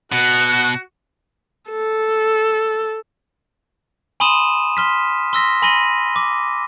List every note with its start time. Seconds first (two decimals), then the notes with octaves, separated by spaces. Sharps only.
0.12 B2 F#4 F#6
1.70 A4
4.20 G#5 B5 C6 D#6 D#7 E7
4.77 C6 F6 B6
5.33 C6 E6 A#6 B6
5.62 G#5 B5 C6 A#6 D#7 G7
6.16 D6